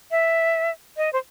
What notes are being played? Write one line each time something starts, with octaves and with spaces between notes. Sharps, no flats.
E5
D#5
C5